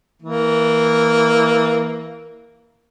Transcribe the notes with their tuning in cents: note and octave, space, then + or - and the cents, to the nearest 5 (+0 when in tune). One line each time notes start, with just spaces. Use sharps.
E3 -15 A#3 +0